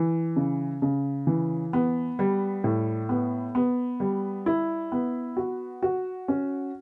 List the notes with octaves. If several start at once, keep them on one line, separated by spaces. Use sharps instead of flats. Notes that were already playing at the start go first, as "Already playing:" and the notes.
Already playing: E3
C#3
C#3
E3
B3
G3
A2
B3
B3
G3
E4
B3
F#4
F#4
C#4